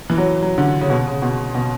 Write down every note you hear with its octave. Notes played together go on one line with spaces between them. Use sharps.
E3
F#3
F#3
D3
C#3
B2
C#3
B2
B2